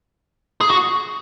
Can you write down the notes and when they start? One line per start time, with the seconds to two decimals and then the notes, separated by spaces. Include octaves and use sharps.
0.61 G#4
0.70 F#4